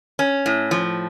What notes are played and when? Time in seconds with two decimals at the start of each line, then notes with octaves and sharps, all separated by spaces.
0.19 C#4
0.46 A2
0.71 F3